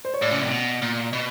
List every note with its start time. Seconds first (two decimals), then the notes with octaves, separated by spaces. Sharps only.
0.05 C5
0.14 C#5
0.21 A2 D5
0.31 C#3
0.42 C3
0.52 B2
0.82 A#2
1.13 B2